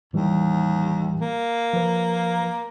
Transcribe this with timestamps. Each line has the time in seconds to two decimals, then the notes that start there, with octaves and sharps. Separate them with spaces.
0.13 D#2 A2 E3 G3
1.21 A#3
1.73 F3 B4